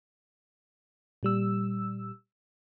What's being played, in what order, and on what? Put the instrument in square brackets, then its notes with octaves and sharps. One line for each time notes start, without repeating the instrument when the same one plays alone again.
[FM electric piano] A#2 G3 E6